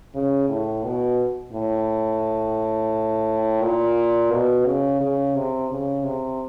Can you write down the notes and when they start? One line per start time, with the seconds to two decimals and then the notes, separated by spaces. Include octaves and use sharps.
0.14 C#3
0.49 A2
0.84 B2
1.53 A2
3.62 A#2
4.31 B2
4.66 C#3
5.01 C#3
5.35 C3
5.70 C#3
6.04 C3